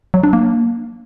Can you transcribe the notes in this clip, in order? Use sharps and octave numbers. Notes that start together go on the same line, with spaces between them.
F#3
D4
A#3